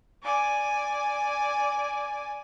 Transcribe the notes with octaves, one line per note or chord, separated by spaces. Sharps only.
D5 G#5